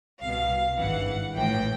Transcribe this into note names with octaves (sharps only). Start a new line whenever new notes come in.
C2 B2 F5
G#1 G2 E3 F#5
A#1 A2 E3 G5